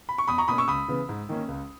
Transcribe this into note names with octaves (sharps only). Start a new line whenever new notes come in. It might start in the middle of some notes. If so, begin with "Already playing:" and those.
B5
C#6
E2 B5 D#6
A#5 C#6
B2 A#3 C#4 B5 D#6
C#6 E6
C#2 B5 D#6
C#3 E3 B3
G#2
D#3 A#3 C#4
C#2